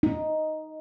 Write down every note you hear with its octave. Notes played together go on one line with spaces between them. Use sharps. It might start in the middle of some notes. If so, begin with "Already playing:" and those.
D#4